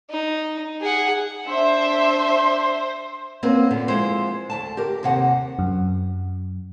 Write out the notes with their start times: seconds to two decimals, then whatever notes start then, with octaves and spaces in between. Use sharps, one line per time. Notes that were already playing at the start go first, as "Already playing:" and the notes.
0.10 D#4
0.81 G#4 F#5
1.49 D4 C5 E5
3.43 A#3 C4 C#4 F#4 B4
3.71 A#2 D3 B3
3.88 F3 G#3 E4 C5
4.50 D2 G#2 A5
4.77 G4 A#4
5.03 D#2 C3 F#5
5.59 F#2